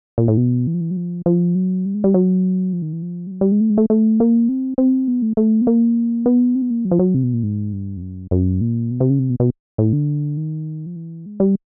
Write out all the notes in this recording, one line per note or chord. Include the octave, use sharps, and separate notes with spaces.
A#2
A2
B2
E3
F3
E3
F#3
F3
F3
F#3
G3
G#3
G3
F#3
F3
D#3
E3
F3
G3
F#3
G3
G#3
A3
G#3
A3
A3
A#3
C4
C4
B3
A3
A3
B3
A#3
B3
C4
B3
A#3
F#3
F3
F#3
C3
B2
A#2
G#2
G2
F2
F#2
F#2
A#2
B2
C3
C#3
C3
B2
B2
A2
D3
D#3
F3
E3
G#3
G3